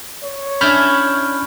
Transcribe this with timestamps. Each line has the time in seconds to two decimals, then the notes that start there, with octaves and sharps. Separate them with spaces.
0.23 C#5
0.61 C#4 D4 E4 B5 F6 G6